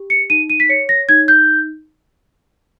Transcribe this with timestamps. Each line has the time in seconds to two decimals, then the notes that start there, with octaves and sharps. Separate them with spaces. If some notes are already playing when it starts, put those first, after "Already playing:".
Already playing: G4
0.10 C#7
0.30 D#4 D#7
0.50 D#7
0.60 B6
0.69 C#5 C#7
0.89 A#6
1.09 D#4 G#6
1.28 G6